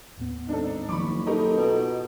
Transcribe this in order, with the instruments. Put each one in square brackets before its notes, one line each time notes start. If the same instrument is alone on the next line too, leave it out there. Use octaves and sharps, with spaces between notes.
[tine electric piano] D#2 A2 B3
[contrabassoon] G#1 [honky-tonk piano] D4 A4 [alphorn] D#4
[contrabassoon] F#1 [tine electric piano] D#3 F3 [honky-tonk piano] B5 C#6 D6
[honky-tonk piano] D#4 G4 A#4 [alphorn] A4 [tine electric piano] A#5
[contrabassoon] B2 [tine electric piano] F4 B4 D#5